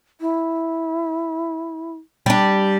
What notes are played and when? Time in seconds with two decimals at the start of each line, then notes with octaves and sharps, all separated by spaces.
0.21 E4
2.26 G3 D4